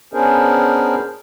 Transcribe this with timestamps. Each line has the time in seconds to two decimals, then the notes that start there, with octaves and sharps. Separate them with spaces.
0.14 B3 C#4 D4 G#4 A#4 C5